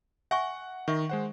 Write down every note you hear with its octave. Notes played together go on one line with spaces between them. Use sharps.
E5 F#5 G#5 C#6
D#3 E5 C#6
G#3 C5 F#5